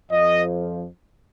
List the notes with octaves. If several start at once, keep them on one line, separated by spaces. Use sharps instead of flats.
F2 F3 D#5